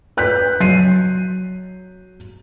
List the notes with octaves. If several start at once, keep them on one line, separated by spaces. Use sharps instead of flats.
B4 F#6 G6 B6
F#3 C7 D#7